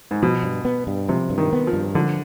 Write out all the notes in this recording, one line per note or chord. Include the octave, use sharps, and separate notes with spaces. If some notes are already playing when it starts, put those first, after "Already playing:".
G#2
B2 F3
G2
B3
G2
C3 F3
G2
D#3
B3
F3
G2
D3 F3